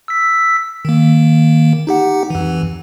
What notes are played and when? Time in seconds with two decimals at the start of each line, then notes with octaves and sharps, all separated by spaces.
0.08 E6 B6
0.85 D#3 A#3
1.87 D#4 G4 F#5
2.30 F2 E3